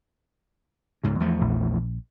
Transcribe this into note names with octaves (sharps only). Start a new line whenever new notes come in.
C#2 G#2 C#3
E2 F3 A3
A#1